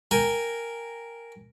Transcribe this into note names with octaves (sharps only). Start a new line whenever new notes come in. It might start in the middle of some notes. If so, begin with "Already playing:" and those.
A#4 G5 G#5